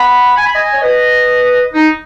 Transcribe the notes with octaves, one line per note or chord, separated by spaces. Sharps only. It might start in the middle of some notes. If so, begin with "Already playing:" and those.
Already playing: F#5 B5
G#5
B5
D#5 G#5
C#5
B4 D#5
D#4